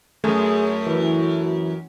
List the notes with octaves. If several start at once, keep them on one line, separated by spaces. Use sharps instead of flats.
F#2 A3 G#4
E3 F#4